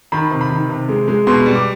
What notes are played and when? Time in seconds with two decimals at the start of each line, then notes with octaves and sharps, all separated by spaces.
0.12 D#3 B5
0.31 C3
0.41 B5
0.51 D#3
0.70 C3
0.89 G#3
1.08 G#3
1.27 B2 C6
1.46 G3
1.55 D6